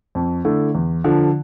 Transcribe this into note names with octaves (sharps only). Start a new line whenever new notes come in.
F2
D3 A3 E4
E2
D3 F3